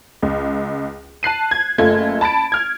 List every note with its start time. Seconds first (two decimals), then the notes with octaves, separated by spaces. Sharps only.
0.23 C#2
1.23 A5 F#6 C7 D#7
1.51 G#6
1.78 F#1 A3 F4 G#6
2.21 A5 B5 A6 D7
2.52 F6 G#6